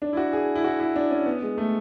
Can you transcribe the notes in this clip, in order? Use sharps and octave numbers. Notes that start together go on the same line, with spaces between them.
D4
E4
F#4
G#4
E4
F#4
E4
D4
C#4
B3
G#3
A3